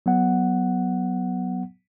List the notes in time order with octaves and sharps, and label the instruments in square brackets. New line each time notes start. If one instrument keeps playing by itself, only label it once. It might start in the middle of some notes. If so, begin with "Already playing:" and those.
[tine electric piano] F#3 B3 F#5